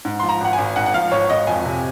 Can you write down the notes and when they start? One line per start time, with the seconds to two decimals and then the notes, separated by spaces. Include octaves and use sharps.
0.05 G#2
0.20 F3 C6
0.29 A#5
0.41 G#1 F#5
0.53 G#5
0.58 G#1
0.76 G#2 F#5
0.86 F#5
0.94 F3 F5
1.12 G#1 C#5
1.30 G#1 D#5
1.47 F2 G#5
1.65 C3